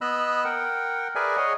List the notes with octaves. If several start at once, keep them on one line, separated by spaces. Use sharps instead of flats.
B3 D#5 B5 E6 F#6
A#4 F#5 G5
G#4 A#4 B4 D5 E5 G#5
G#4 C#5 D#5 F#5 G#5